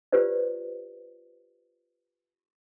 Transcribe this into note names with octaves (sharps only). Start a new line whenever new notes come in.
F4 G4 B4 C5 D5